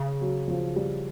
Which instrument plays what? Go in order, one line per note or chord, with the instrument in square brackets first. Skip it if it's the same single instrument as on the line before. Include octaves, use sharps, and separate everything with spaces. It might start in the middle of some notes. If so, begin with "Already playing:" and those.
Already playing: [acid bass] C#3
[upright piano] F#3
F3
G3